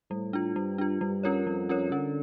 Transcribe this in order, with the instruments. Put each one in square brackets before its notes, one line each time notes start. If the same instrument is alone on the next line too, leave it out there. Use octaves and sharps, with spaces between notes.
[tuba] A2 [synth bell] G3
[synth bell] D4 F4
[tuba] G2 [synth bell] G3
[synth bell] D4 F4
[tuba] G2 [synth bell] G3
[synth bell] C#4 F4 A#4 C#5
[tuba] F2 [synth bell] G3
[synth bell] C#4 F4 A#4 C#5
[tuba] D3 [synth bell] C#4